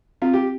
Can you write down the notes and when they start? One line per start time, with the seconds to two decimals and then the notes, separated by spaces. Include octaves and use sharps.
0.22 C4 F4
0.33 G4